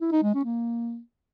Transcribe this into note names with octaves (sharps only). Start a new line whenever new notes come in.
E4
D#4
G#3
C#4
A#3